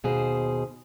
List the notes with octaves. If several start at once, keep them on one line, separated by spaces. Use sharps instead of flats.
D#2 B2 G#4 C5